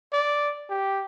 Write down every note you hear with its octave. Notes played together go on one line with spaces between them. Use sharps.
D5
G4